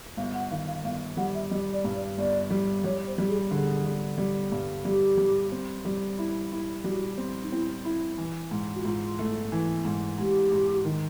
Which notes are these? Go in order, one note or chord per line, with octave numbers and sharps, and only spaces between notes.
G1 F5
F#5
D#3 F5
F5
G1 F5
G3 F#5
E5
G3 D#5
D5
G2
D5
G1 D5
G3
G3 C#5
C5
G3
G#4
D3 G#4
D3
G3
G2
G3 G4
G3
C4
G3
E4
E4
G3 F#4
C4
D#4
C4 E4
E4
E3
G#2
F#4
G#2 F4
A3
E3
G#2
G#2 G4
G#2
D#3